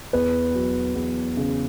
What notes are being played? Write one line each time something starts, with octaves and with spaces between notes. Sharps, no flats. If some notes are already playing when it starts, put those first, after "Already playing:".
E2 B4
F#3
E2
C#3